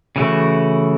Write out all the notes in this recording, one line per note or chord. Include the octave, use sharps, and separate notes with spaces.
C#3 E3 A3 F#4